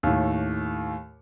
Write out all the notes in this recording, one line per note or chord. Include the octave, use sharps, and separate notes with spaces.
D#2 A2